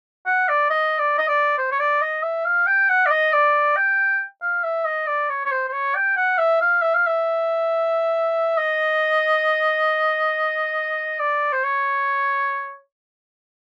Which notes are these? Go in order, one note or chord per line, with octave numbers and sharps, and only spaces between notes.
F#5
D5
D#5
D5
D#5
D5
C5
C#5
D5
D#5
E5
F5
G5
F#5
D5
D#5
D5
G5
F5
E5
D#5
D5
C#5
C#5
C5
C5
C#5
G5
F#5
E5
F5
E5
F5
E5
D#5
D5
C5
C#5